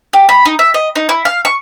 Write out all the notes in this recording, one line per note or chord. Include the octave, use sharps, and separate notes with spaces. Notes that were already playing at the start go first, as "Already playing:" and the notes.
G4
B5
D#4
E5
D#5
D#4
E4
F5
C#6